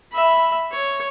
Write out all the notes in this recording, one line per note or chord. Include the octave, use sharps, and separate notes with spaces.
E5 B5
C#5